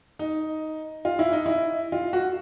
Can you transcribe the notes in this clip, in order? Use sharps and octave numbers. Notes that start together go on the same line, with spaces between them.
D#4
F4
E4
D#4
E4
F4
F#4